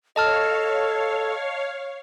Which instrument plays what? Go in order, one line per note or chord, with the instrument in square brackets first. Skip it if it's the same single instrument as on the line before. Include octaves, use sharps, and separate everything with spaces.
[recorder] A4 [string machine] C#5 F5 [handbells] D#5 A5 F6